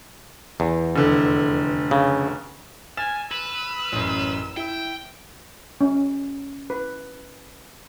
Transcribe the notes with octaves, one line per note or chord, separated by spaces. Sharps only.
E2
F1 D3
C#3
G#5 F6 A6 E7
B4 E6
A1 F#2
E4 G5
C#4
B4